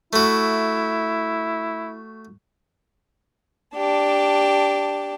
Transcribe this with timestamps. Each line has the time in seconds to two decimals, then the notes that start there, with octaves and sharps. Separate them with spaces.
0.13 A3 E4 F#4
3.77 D4 G4 A5